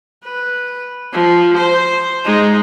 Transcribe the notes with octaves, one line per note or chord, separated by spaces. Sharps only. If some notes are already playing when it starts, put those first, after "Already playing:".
B4
F3
C5
G#3 D#4